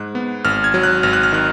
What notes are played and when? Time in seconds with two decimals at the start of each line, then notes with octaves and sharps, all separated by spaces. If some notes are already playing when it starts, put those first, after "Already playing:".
Already playing: G#2 F#6
0.15 B3
0.45 G#1 F6
0.64 G#6
0.74 F#3
0.83 F#6
1.03 G#1 F6
1.13 F#6
1.23 F6
1.32 D#3 F#6